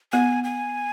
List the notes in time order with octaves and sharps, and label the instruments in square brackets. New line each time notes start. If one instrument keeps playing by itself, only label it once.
[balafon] B3 [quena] G#5
[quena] G#5